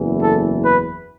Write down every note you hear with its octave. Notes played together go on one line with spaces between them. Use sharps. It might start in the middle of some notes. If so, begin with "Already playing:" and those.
Already playing: F#1 E2 E3
A4
B4